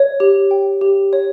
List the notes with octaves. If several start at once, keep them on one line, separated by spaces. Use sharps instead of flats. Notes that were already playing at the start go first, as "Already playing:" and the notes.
Already playing: C#5
G4
G5
G4
C#5